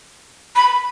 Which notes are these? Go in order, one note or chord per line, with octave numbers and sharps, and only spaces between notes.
B5